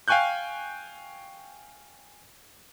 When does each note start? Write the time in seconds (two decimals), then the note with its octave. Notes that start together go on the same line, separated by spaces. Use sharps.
0.08 F5 G5 G#5 C#6 F#6 G6